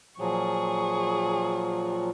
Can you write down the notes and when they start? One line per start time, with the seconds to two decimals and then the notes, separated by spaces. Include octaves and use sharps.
0.19 A#2 F3 F#3 G#4 C#6